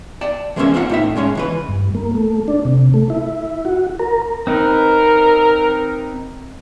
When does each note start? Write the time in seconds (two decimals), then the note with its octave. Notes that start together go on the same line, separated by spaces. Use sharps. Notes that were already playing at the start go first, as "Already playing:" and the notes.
0.21 D5 G5 A5
0.56 E3 G#3 A#3 C4 C#4 E5
0.74 A#3 C4 C#4 F4 F5 F#5
0.89 A2 D#4 E5
1.16 A2 G#3 C#4 C#5
1.35 C#2 E3 B4
1.69 G2
1.95 A#3
2.15 A3
2.48 D4
2.65 C3
2.94 A3
3.10 E4
3.65 F#4
3.99 A#4
4.47 C4 D#4 A#4 B4